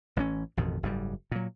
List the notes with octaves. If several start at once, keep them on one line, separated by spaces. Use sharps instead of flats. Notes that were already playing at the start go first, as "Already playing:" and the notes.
A1 E3 G#3 C#4
A1 F2 B2 D#3
F#1 G#2 G3
A#2 F#3